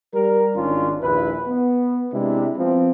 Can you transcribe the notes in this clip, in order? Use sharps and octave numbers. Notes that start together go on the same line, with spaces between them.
G3 A#4
G#1 D#3 C#4 D4 F4
A#1 D#2 E4 B4
B3
C3 G#3 D4 E4
F3 B3 C4